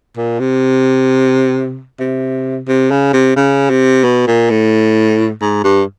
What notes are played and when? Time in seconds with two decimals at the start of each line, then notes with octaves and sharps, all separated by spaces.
0.17 A#2
0.40 C3
1.99 C3
2.67 C3
2.91 C#3
3.13 C3
3.36 C#3
3.70 C3
4.04 B2
4.27 A#2
4.50 A2
5.41 G#2
5.64 G2